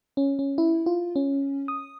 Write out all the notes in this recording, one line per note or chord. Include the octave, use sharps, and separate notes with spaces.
C#4
C#4
E4
F4
C#4
D#6